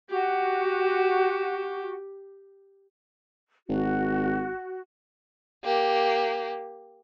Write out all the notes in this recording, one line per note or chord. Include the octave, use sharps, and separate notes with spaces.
F#4 G4
G#1 F#4
A#3 G4